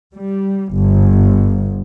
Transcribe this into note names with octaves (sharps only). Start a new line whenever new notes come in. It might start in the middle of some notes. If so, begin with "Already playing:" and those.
G3
G1